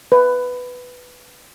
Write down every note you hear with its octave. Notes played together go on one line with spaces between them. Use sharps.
B4